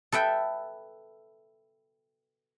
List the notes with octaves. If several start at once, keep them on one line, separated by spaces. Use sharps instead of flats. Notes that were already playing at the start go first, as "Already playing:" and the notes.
A4 B4 E5 G5